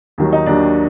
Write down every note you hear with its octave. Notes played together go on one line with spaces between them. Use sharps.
D#2 D#3 F#3
D#4
D#2 D#3 F#3 D4